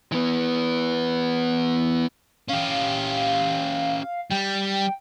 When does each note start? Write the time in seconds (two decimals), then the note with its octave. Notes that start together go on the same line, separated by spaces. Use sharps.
0.12 E3 B3
2.49 C#4 G4 F5
4.31 G3 G5